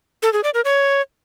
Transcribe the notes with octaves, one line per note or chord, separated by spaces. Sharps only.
A4
G#4
D5
A#4
C#5